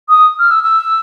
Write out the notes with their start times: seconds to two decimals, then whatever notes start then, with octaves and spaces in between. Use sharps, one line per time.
0.09 D#6
0.39 F6
0.51 E6
0.64 E6